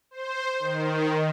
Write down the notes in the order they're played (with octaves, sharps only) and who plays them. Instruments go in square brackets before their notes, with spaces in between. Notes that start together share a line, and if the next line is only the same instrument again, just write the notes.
[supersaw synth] C5
D#3